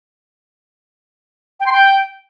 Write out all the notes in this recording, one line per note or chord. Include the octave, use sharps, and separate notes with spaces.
G5
C6
G5